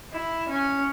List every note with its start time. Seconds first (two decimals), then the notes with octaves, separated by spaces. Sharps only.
0.13 E4
0.49 C#4